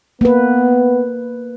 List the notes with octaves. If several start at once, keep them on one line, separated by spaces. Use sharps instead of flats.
A#3 B3 B4